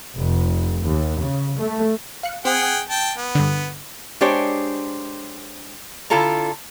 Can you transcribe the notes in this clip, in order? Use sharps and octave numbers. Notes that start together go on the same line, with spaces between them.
F1
D#2
C#3
A3
F5 F#6 C#7
C4 G#4 F#5 G5
G5 A5
B3
G2 D3
G#3 D4 G4 C5 C#5
D3 E4 F4 A4 A5 A#5